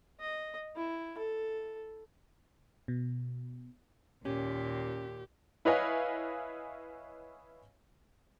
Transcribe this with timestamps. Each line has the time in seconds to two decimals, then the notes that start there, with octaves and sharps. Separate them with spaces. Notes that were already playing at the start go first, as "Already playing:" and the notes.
0.20 D#5
0.76 E4
1.18 A4
2.88 B2
4.25 D#2 A#2 C#4 G4
5.65 E4 B4 C#5 D#5 F5 G#5